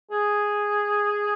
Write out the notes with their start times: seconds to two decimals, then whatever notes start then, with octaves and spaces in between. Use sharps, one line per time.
0.12 G#4